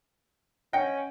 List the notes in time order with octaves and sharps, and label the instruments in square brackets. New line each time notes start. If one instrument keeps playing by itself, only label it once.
[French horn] C#4 [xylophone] D#5 F#5 [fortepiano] G5